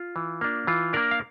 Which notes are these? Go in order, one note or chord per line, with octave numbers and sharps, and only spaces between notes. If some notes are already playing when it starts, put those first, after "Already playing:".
Already playing: F4
E3
A#3 D4
E3 F4
A#3 D4 A#4 D5
F5